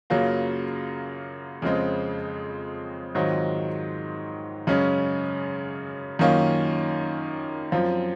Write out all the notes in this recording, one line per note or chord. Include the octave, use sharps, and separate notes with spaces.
F#2 C#3 F#3 A#3 F4
F2 C#3 G#3 C4
G#2 D#3 F#3 C4 F4
F#2 C#3 G#3 C#4
F#2 D#3 A#3 C#4 F4
F#2 F3 C4 F4